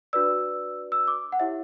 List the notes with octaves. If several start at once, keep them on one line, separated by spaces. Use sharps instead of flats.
D4 F#4 B4 D5 E6
E6
D6
F#5
E4 G4 C#5 E5